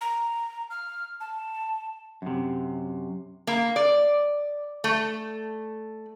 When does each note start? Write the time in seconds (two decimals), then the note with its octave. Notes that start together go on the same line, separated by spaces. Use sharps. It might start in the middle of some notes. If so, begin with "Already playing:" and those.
0.01 A#5
0.70 F6
1.20 A5
2.22 F#2 C3
3.47 A#3
3.76 D5
4.84 A3